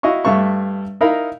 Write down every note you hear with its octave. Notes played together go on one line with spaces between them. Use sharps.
E4 F#4 D#5 F5 C#6
G2 A3 E5 F5 C#6
D#4 E4 A#4 F5 B5